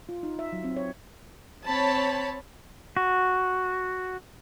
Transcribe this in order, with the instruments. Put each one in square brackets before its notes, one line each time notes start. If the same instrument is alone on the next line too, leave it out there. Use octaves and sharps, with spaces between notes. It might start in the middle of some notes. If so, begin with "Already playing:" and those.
[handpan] F4
D#4
E5
F#3
C4
C#5
[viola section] C4 C#5 A5 B5
[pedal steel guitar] F#4